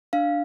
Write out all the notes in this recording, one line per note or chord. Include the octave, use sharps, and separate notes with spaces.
D4 F5